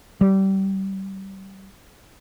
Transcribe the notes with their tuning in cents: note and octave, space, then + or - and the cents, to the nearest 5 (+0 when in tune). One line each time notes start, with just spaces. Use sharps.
G3 -25